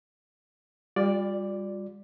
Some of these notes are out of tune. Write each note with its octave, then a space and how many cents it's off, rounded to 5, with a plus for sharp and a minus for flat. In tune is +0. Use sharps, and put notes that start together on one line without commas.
G3 +30 F4 +45 D5 +0